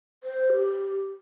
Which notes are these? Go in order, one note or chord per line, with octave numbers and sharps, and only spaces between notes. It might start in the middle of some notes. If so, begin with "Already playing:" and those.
C5
G4